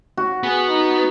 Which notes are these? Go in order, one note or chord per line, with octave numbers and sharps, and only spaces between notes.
F#4
B3 G#4
D#4